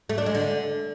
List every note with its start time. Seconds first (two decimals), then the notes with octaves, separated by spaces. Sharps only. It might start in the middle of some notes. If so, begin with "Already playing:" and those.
0.09 A3
0.18 D4
0.26 G#3
0.35 D3